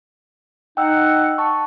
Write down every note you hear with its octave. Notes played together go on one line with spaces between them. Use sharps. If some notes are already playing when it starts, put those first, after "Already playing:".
D#4 F#5 G5 E6
A5 C#6